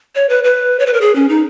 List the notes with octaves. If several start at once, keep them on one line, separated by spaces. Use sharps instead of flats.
C#5
B4
B4
C#5
B4
A#4
G#4
C#4
D#4